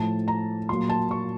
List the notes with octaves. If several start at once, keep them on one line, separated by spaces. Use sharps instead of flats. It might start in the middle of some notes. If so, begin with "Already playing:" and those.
Already playing: A2 F3 A3 A5
A#5
A#2 F#3 A#3 C6
A5
C#6